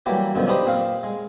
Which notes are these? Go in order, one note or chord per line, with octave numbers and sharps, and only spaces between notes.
E3 F#3 G3 A#3 G4
F#2 B2 D3 D#3 F3
D4 D#4 G4 B4 C5 D#5
A#2 C4 F5
G#3